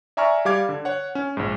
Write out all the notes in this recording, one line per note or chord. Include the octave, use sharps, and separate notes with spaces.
D5 E5 G#5 A#5 C#6 F6
G3 G4 F5 D6 G#6
D3
C#5 F#5
C#4
A#1 G#2